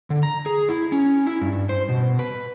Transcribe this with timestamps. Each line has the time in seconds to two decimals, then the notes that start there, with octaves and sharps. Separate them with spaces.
0.10 D3
0.23 A#5
0.46 G#4
0.69 E4
0.92 C#4
1.27 E4
1.41 G2
1.69 C5
1.89 B2
2.19 B4